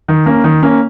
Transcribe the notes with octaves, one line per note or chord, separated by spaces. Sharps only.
D#3
A#3 C#4
D#3
A#3 C#4